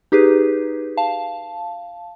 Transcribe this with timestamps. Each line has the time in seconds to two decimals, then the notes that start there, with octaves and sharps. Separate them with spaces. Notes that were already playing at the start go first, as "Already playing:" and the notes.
0.12 D#4 G4 G#4 B4
0.97 F5 A5